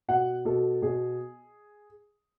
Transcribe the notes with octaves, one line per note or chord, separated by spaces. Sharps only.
B2 F#5
B2 A4
B2 G#4